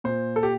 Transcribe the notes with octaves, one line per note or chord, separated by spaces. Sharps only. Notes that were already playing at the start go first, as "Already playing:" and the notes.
A#2 C5
A4
G4